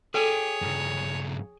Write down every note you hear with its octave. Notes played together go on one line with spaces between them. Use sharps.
G#4 A4 C#5 G5 G#5
G2 C#3